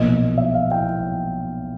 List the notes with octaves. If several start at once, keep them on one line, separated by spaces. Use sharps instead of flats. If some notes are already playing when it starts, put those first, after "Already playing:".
Already playing: B1 A#2 F3 D#5
E5
F5
G5